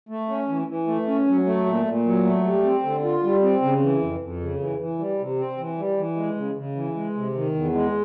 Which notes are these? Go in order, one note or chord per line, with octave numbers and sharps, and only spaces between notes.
A3
C#4
E3
E3
A3
C#4
F#3
A3
A#2
A#2
F#3
A3
G3
C4
D3
F4
G3
C4
C#3
E3
F2
F2
C#3
E3
E3
G3
C3
C4
E3
G3
E3
G#3
C#3
C#3
E3
G#3
C3
D#3
E2
G#3